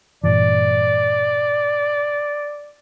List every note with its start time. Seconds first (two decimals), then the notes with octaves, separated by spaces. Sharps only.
0.24 G2 A#2 E3 D5